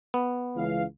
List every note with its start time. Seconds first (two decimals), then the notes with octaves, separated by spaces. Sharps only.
0.14 B3
0.56 C#2 E3 F5